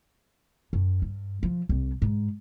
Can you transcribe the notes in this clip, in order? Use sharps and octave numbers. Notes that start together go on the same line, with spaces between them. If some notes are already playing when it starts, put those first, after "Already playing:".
F#2
G2
F3
C2
G#2